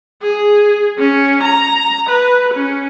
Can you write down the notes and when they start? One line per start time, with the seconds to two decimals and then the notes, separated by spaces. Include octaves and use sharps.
0.22 G#4
0.99 C#4
1.43 A#5
2.09 B4
2.54 C#4